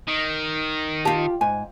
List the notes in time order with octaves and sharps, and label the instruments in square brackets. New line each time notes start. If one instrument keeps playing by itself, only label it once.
[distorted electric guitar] D#3
[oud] F4 G4 [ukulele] A5
[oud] G#2 [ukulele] G#5